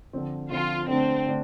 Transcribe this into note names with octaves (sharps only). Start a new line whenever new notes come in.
D3 F3 C4
D3 F3 C4 F4
D3 A3 C4 D4
D3 A3 D4